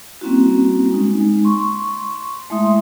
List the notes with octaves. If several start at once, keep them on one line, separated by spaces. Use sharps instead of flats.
G3 A#3 C4 C#4 E4 F#4
G#3 C#4 D#4
G#3
C6 C#6
G#3 A3 E4 E5 C6 D#6